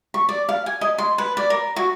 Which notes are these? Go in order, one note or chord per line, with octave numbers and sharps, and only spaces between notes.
C#6
D5
F5
G#5
D#5
C6
B4
D5
A#4
F#4